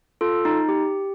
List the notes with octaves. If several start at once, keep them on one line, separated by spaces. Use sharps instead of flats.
F4 A4
D#4
G4